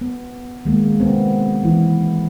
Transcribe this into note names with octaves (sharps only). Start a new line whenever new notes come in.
B3
D#3 G#3 A#3
B3 C4
E3 E4